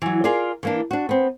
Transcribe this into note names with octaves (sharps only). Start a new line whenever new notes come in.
E3 F#3
F4 G#4 A#4 D5
E3 A#3 D4
D4 F#4
B3 C4